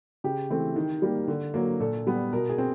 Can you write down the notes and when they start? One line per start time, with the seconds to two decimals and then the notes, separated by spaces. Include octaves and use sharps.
0.24 C#3 G4
0.50 E3 A3 C4
0.76 D#3
1.02 G3 A#3
1.28 D3
1.54 F#3 A#3
1.80 A#2 A4
2.07 G3 B3
2.33 B2 A#4
2.49 G#4
2.58 C4